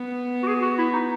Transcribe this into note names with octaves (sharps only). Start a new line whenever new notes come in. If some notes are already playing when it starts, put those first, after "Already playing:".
Already playing: B3
F#4
G#4
F#4
E4
D#4